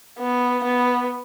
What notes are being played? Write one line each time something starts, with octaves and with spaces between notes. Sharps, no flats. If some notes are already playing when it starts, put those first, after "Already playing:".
B3
B3